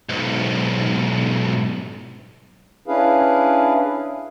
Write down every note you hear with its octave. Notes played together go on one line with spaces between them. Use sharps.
B1 G#2
C#4 D4 E4 G#4 B4 F5